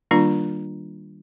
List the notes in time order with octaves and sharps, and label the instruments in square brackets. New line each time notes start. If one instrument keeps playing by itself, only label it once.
[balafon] D#3 G3 A#3 D4 F4 A#5